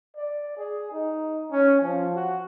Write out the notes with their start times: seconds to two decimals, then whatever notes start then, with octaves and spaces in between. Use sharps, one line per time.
0.16 D5
0.58 G#4
0.92 D#4
1.51 C#4
1.82 F3
2.16 F#4